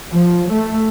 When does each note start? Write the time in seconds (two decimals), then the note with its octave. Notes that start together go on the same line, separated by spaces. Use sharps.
0.13 F3
0.51 A3